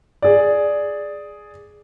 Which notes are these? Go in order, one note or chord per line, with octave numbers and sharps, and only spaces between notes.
G#4 D5